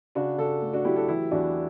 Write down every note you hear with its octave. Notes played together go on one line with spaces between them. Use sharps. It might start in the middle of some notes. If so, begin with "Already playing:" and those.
C#3 D4 F#4
C#3 F#4 A4
A3
D4 F#4
F#3 E4 G4
F#4 A4
E3 E4 G4
E2 D4 F#4